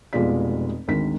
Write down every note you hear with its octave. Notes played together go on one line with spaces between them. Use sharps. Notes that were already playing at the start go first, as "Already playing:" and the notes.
F1 B2 G#3 F4 D5 B6
G#1 D2 D#3 B6